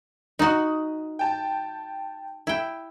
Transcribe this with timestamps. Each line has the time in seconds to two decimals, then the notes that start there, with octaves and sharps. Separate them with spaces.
0.39 D#4 F#4 D#6 F#7
1.19 G5 A5
2.47 E4 G5